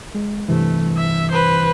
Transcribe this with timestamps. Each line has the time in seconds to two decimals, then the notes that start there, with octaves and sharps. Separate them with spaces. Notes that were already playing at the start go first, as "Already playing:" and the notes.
0.14 G#3
0.48 G2 C3 E3 A3
0.97 E5
1.31 B4 C5